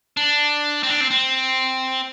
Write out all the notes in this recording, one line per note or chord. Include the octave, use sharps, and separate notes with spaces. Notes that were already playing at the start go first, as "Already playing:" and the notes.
D4
C4
D4
C4
C4